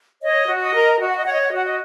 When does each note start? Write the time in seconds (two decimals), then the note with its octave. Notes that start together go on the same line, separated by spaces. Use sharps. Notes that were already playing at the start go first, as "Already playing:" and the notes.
0.22 C#5 D#5
0.48 F#4
0.61 D#5
0.74 A#4
1.00 F#4 D#5
1.08 F#5
1.16 D#5
1.24 C#5 F#5
1.32 D#5
1.40 F#5
1.48 D#5
1.52 F#4 F#5
1.64 D#5